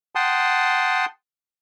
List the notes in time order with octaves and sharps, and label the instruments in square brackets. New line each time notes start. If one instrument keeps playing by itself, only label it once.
[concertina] F#5 G5 A5 C6 D#6